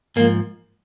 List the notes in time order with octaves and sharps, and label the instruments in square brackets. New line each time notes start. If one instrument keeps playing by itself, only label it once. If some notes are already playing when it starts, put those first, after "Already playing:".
[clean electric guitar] G#2 F3 A#3